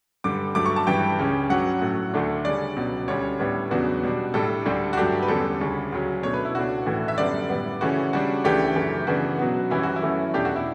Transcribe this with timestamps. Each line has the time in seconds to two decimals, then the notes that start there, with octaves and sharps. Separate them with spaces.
0.24 G2 D3 G3 D6
0.55 G2 F#3 A3 D6
0.66 C#6
0.76 A5
0.87 G2 E3 G3 G5
1.18 C#2 C#3 G3 C#4
1.50 G2 F#3 C#4 F#5
1.82 A2 F#3 A3
2.14 D2 D3 A3 D4
2.44 C#3 G3 C#4 D5
2.76 C#2 B2 F#3
3.08 D2 D3 G3 C#4 C#5
3.39 A2 G3 B3 D4
3.71 E2 C#3 F#3 B3 D4 F#4
4.03 B2 G3 D4
4.34 A2 G3 D4 A4
4.66 D2 D3 G3 D4
4.93 F#4
4.97 G2 F#3 A3 D4 G4
5.22 B4
5.28 E2 D3 G3 C#4 A4
5.61 D2 C#3 G3
5.92 D2 C#3 F#3 C#4
6.23 B2 A3 D4 C#5
6.34 B4
6.45 E4
6.55 C#2 B2 A3 D4 F#4
6.86 A2 E3 A3
7.08 E5
7.18 F#2 D3 G3 B3 D4 D5
7.49 A2 G3 B3
7.81 C#3 E3 A3 C#4 F#4
8.13 C#3 G3 D4 F#4
8.44 C#2 C#3 E3 A3 D4 G4
8.76 F#2 C#3 E3 A3
9.07 C#3 E3 B3 D4 F#4
9.39 B2 F#3 B3
9.70 F#2 E3 G3 C#4 E4
9.83 F#4
9.96 E4
10.02 F#2 E3 A3 C#4
10.34 E2 B2 A3 D4 G4
10.45 F#4
10.56 E4